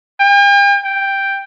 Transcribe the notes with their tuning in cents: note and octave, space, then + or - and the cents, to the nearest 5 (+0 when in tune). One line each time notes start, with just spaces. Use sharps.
G5 +45
G5 +5